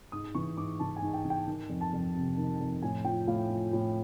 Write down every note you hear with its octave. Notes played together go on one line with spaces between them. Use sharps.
G#2 D#6
E3 C#6
G#2 D6
E3 A5
G#5
G#2
G5
E3
G5
D#3
F2
A5
F2
C3
D#3
F2
A2 G#5
F3 G5
A2 F5
F3
A2